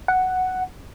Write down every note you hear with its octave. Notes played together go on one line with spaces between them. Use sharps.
F#5